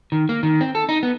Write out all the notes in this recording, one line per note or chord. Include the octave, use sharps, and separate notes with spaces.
D#3
A#3
D#3
C4
A4
D#4
B3